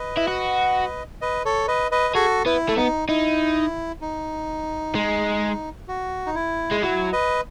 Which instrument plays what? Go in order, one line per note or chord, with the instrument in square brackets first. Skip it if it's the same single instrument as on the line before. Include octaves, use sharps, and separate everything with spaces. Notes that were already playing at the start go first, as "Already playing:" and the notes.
Already playing: [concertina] B4 D#5
[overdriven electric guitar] E4
F#4
[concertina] B4 D#5
A4 C#5
B4 D#5
B4 D#5
[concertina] F#4 A4 [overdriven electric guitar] G#4
[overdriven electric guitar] B3 [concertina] E4
[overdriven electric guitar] A3
[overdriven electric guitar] B3 [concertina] D#4
[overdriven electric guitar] D#4 [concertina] E4
[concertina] D#4
[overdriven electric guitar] G#3
[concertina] F#4
D#4
E4
[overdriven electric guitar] G#3
[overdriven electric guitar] F#3 [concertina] E4
[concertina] B4 D#5